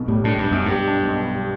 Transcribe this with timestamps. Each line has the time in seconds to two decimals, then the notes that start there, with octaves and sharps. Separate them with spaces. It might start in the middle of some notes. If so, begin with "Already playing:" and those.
Already playing: B1 B2
0.08 A2 G3
0.24 A2 D4
0.38 B1 G2
0.52 F#2 B2
0.66 G2
0.71 G3
0.88 D4
1.03 B1
1.18 B2
1.35 G3